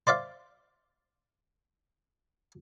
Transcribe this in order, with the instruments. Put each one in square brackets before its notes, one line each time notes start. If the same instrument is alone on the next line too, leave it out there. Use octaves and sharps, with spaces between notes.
[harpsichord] C5 D5 E5 F5